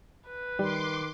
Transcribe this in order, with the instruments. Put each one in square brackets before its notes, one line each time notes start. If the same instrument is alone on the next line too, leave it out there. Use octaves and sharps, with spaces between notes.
[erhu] B4
[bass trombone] D#3 [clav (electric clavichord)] G3 [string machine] C6 D6